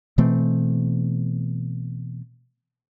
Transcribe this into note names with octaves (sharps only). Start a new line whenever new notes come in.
B2 E3 A3 C4